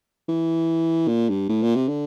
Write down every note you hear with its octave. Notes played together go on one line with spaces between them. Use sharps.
E3
A#2
G2
A2
A#2
C3
D3